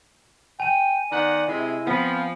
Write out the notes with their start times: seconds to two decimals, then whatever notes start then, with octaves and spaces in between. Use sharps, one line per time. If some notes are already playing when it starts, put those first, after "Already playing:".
0.60 G5 G#5 D#7
1.11 D#3 B3 D5 F#5
1.48 C3 G#3 E4
1.87 F3 B3 C4